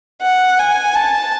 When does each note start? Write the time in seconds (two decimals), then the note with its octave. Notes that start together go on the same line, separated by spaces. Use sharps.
0.22 F#5
0.59 G#5
0.95 A5